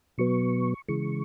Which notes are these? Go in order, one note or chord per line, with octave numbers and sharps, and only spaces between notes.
B2 F#3 B3 C#6
C#3 E3 G#3 C#6